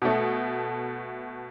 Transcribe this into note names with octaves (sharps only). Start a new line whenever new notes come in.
B2 A3